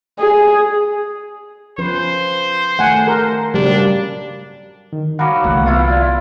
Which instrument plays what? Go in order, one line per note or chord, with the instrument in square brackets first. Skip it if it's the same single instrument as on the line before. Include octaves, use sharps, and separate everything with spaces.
[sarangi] G#4
[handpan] F3 C#4 B4 [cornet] C5
[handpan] D#3 A3 [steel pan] F#5 G#5
[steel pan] A#4
[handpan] C#3 F#3 A#3 [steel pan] G3 [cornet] D4
[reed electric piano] D#3
[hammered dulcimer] F#3 G3 [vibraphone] F5 B5 [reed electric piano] F#5 A#5 D6
[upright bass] C2 E3 [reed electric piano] D3 A3 A#3 [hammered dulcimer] F#5
[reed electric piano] B3 [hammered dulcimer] E4 F4
[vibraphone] D5 F5